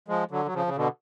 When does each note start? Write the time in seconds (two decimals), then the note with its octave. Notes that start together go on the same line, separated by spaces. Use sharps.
0.08 F3 G#3
0.31 D3 F#3
0.46 F#3
0.54 C#3 F3
0.66 C#3
0.76 B2 D3